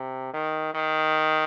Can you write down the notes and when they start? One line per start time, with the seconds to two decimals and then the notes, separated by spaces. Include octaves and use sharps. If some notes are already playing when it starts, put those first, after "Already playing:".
Already playing: C3
0.34 D#3
0.74 D#3